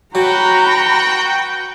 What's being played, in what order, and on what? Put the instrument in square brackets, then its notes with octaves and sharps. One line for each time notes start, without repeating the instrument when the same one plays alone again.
[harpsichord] F#3 [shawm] F#4 [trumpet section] B4 G5 [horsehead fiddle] A#5 B5